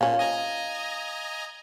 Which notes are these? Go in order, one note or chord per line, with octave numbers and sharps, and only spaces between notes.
A#2 F3 C#4 F5
D#5 G#5 A#5